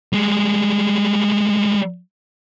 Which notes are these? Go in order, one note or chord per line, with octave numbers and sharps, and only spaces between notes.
G3 G#3